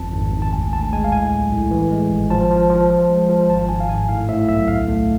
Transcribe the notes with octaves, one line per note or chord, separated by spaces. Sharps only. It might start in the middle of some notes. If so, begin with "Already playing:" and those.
Already playing: G#1 F2 A5
G#1
G#1
A5
D2 G#5
D2 A5
G#3 G#5
F5
A2 G#5
B1
A2
E3
G#3
G#1
F3 A5
F3
F3
F3
G#3
F3
G#1 A5
G#1 G#5
F5
G#2 G#5
A2 F5
A2 E5
B1 E5
D2 F5
A3